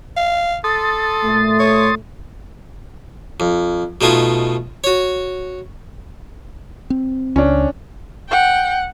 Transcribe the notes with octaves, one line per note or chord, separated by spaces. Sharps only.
F5
A4 C6 D#6 A6
A#2 A3
C#5
F2
B2 A3 D#4 F4 G#5
F#4 C#5
C4
C#2 C#4 D4
F#5 G5